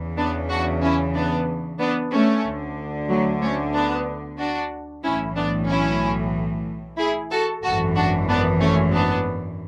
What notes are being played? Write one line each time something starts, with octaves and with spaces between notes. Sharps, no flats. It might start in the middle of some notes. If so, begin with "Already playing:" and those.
Already playing: E2 C#3 E3
B3 D4
D4 F#4
C#4 E4
B3 D4
B3 D4
A3 C#4
D2 D3
F#3 A3
A3 C#4
B3 D4
D4 F#4
B1 A2 E3 C#4 E4
B3 D4
C#4 E4
E4 G#4
F#4 A4
G#1 F#2 E3 F#4 A4
D4 F#4
B3 D4
A3 C#4
B3 D4